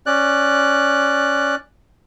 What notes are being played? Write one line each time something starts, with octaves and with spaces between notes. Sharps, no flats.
C#4 D5 F#6